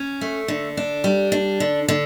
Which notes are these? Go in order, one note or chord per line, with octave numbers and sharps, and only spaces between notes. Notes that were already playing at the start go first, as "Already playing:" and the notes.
Already playing: C#4
A3
D3
D4
G3
D4
D3
D3